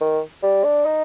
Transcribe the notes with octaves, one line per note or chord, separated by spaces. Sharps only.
D#3
G3
D4
D#4